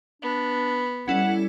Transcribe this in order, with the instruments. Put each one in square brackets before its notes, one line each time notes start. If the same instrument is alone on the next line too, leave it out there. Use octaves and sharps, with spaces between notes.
[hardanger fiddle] B3 [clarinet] D4
[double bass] G3 [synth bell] C#4 E4 A4 [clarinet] F#5